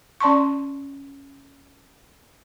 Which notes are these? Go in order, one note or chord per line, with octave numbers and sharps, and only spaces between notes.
C#4 D5 A5 C6 C#6